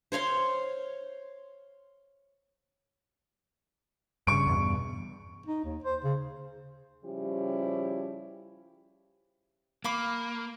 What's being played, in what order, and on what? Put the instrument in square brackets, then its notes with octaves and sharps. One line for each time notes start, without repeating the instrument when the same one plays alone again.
[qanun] C5 C#5 F5 C6
[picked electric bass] G2 C#3 [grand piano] C#6 D7
[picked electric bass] E2 G2 B2
[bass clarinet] D#4
D#2
C5
C#3
[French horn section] C#3 F3 G3 C#4 E4 G4
[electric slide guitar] A#3 [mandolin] F5 B5 D6